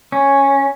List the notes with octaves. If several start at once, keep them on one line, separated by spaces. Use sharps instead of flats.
C#4